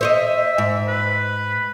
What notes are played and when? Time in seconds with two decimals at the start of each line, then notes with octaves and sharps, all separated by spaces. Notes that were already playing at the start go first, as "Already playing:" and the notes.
0.01 C5 C#5 D#5 E5
0.58 G#2
0.88 B4